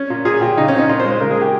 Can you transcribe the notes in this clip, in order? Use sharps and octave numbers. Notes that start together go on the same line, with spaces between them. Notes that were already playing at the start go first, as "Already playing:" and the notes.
Already playing: C#4
A#2
A#2 G#4
A#2 G4
C#3 D#4
C#4
C4
D#4
A#2 F4
C5
G#3
C5
C#3 A#4
G#4
A#3 G4